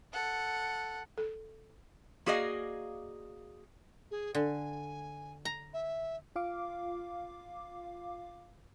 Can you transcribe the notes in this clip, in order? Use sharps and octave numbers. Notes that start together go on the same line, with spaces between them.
A4 F#5
A4
A#3 F#4 G#4 D5 D#5 F5
G#4
D3 G#5
A#5
E5
F4 F5 D6